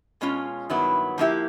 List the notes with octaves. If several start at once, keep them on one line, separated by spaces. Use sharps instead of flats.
B2 G#3 C#4 F4
G2 D#3 F#3 B3 E4
F3 A#3 C#4 E4 G4